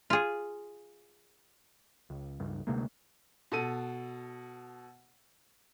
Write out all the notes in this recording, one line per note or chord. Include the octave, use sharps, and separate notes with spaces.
F4 G#4
C#2
C#2 G2
D2 C3 G#3 A#3
B2 A4 D#7